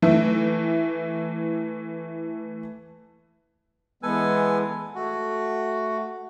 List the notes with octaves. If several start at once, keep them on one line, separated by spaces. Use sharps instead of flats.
E3 A3 E5
E3 G#3 B3 A4 B4 G#5
A3 F#4